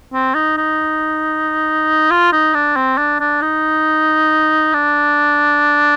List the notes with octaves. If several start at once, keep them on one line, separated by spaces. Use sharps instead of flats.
C4
D#4
D#4
F4
D#4
D4
C4
D4
D4
D#4
D4